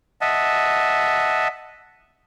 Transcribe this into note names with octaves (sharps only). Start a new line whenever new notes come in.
D#5 E5 F#5 A5